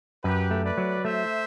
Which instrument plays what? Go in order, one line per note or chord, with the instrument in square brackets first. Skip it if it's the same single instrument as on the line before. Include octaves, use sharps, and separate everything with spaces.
[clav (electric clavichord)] F#2 [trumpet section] G4 B4
[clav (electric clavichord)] A3
[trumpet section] B4 D5
[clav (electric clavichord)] F#3
[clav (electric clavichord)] A3 [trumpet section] C5 E5